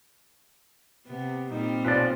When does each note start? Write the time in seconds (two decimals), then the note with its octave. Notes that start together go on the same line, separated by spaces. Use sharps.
1.07 C3 B3
1.51 A#2 G3 C4 D#4
1.85 B1 F3 B4 D5